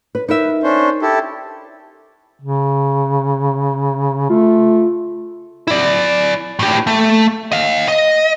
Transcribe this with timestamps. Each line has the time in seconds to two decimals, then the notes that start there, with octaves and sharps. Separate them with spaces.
0.15 B4
0.28 D#4 A#4 B4 E5
0.63 C#4 D4 C5
1.02 E4 G4 A4
2.40 C#3
4.30 A3 F4
5.68 E4 D5
6.59 A2 G4
6.87 A3
7.52 D#5 F5
7.88 D#5